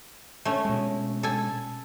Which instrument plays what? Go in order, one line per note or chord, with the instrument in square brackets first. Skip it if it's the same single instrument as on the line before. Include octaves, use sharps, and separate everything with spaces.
[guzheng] A3 C#4
[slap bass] B2 G#3
[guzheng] A4 G#5